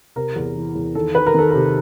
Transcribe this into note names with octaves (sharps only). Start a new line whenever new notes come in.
C3 A#4
E2
E3
E2
D#3 A4
D#3 B4
A#4
D#3 A4
C3 A#4